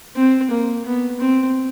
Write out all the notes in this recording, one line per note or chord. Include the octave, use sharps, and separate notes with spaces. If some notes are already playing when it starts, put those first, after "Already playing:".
C4
A#3
B3
C4